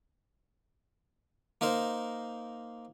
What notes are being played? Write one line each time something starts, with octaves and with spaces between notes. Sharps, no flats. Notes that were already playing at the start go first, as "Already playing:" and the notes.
A#3 D#4 A#4 C5